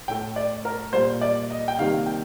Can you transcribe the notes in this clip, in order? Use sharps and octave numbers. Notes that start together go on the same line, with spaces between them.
A2 A3 G5
D5
A#4
A#2 G3 A#3 C5
D5
D#5
G5
C3 D#3 G3 A#3 F5
G5